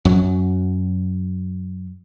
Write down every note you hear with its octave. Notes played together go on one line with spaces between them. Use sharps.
F#2 F#3